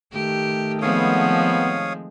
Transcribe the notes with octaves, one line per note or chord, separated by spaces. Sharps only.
D#3 A3 G4
F3 G#3 B3 C4 C#5 F5 D#6